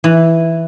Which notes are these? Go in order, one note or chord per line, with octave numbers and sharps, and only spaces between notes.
E3